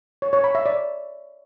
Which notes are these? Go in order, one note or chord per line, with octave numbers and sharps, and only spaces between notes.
C#5
C#5
B5
E5
D5